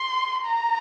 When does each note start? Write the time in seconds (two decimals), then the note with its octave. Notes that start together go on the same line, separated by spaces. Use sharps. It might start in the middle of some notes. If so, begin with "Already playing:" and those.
Already playing: C6
0.45 A#5